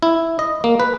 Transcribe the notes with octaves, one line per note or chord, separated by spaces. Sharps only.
E4
D#5
A#3
B4